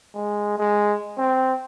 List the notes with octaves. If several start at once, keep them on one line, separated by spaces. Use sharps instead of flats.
G#3
G#3
C4